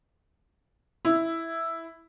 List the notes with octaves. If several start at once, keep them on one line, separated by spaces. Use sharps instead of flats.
E4